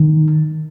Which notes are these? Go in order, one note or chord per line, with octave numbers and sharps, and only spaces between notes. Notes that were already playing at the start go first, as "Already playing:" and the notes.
Already playing: D#3